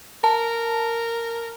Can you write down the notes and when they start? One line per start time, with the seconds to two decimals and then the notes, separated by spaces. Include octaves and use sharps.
0.24 A#4 A5